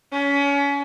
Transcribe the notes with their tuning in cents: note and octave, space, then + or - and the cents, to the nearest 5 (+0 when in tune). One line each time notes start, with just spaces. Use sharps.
C#4 +30